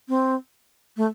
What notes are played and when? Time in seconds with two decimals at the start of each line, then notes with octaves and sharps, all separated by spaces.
0.09 C4
0.97 A3